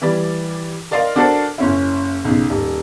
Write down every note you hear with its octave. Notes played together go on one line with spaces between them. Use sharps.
E3 G3 D5 B5
A#4 D5 D#5 F5 C6
D4 F#4 A4 A#4 C5 D5
F#1 C#4 E4
B1 C#3
D#1